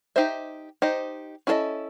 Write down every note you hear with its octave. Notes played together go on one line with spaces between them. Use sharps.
D#4 G4 C5 E5
D#4 G4 C5 D#5
C#4 E4 A4 C5 D#5